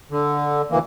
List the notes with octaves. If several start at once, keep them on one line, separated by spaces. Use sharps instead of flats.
D3
D2 E3 A#3